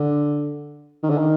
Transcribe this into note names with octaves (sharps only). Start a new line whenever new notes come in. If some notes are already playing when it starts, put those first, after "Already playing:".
Already playing: D3
D#3
D3
D#3